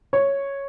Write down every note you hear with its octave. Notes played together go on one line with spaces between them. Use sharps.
C#5